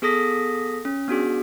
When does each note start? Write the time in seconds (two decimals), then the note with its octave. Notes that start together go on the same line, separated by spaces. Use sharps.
0.02 B3 G#4 A4 D#6 A#6 B6
0.85 C#4
1.08 B3 D4 F#4 G#4